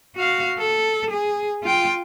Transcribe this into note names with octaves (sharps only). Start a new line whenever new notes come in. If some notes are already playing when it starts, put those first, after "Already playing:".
F#4 F5
A4
G#4
F4 G5